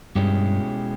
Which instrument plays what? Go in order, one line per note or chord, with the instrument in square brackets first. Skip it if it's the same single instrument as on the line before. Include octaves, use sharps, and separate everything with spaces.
[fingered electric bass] G2 [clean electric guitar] B2 G#3 C#4 E4 G4